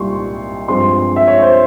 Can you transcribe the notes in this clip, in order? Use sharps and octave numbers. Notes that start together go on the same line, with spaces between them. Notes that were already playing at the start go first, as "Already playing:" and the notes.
Already playing: C2 A#2 G3 C6 C#6
G2 F3 G#3 C4 C6
E5
C#5
C5